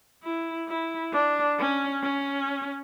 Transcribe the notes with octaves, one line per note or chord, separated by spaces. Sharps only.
E4
E4
D4
C#4
C#4